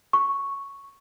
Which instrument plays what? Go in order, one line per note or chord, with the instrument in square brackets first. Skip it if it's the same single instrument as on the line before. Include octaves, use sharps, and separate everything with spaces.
[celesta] C#6